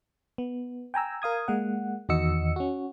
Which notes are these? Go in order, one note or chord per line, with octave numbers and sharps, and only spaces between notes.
B3
G5 G#5 A#5 E6
A#4 F5 D#6 G#6
G#3 A#3 F#5
E2 D#3 F#4 D#5 E6 C#7
C#4 F#4